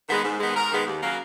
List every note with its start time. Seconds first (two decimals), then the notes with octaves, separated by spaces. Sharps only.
0.08 D#3 G#3 B3
0.24 G#2
0.40 D#3 G#3 B3
0.49 G#4
0.55 G#2 A#4
0.71 D#3 G#3 B3
0.87 D#2
1.03 C#3 F#3 A#3